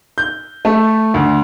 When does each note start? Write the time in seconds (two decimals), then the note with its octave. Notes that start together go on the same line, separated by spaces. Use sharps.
0.18 G6
0.65 A3
1.14 D2